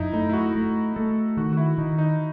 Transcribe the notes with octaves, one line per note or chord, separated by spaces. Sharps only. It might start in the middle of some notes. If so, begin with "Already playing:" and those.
Already playing: F#2 D#4 E4
A3 D#4
E4
F#4
A3
A3 A4
D#3 F#4
F#4
E4
D#3 D#4
D#4